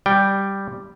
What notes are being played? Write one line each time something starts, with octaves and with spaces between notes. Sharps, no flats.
G3 G5